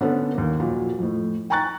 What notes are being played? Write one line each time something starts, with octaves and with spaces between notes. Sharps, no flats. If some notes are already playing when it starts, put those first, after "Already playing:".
D3 B3 C#4 D4 A4
D#2 A#3
F2 A#2 F3 F#3
F2 A2
G5 G#5 A#5 C#6 F#6 A6